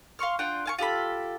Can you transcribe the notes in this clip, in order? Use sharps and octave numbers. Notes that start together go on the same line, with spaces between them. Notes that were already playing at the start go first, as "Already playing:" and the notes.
F5 C6 C#6 F6
D4 F4 F#5 G5
F5 G#5 C#6
F4 G4 A4 B5